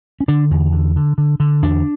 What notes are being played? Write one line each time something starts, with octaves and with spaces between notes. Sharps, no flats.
C#4
D3 D4
E2
D3
D3
D3
D3
E2 D4